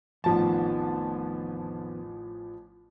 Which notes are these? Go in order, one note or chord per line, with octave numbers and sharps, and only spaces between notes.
A1 F2 D#3 F3 B3 A5